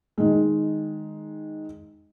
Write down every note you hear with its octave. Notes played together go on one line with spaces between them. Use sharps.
D#3 G#3